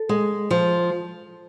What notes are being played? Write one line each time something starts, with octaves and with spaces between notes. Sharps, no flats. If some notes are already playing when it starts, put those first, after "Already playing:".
Already playing: A4
G#3
F3